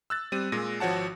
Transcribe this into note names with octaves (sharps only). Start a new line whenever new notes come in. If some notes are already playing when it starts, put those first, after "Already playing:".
E6 F#6 A6
G3 C4 D#7
A#2 G#3 A#6
G#1 F3 F#4 C#5 F#5 A5